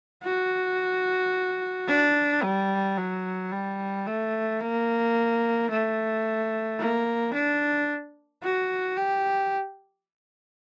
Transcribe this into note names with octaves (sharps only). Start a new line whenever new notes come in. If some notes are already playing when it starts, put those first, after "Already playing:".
F#4
D4
G3
F#3
G3
A3
A#3
A3
A#3
D4
F#4
G4